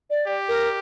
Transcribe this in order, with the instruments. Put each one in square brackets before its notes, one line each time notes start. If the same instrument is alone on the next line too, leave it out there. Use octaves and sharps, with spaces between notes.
[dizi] D5
[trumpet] G4
[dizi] A#4